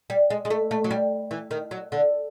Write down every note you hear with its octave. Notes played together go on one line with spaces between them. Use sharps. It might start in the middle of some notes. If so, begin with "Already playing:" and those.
G3
G#3
G#3
A3
A3
F#3
G3
E3
D#3
F#3
D3